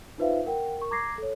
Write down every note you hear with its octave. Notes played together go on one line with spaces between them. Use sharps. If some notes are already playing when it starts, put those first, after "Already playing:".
D#4 F4 B4 C5 E5 F5
A#4 F#5 G5
A#4 C#6
A#5 D6 G#6 A#6 C7
A4 C#5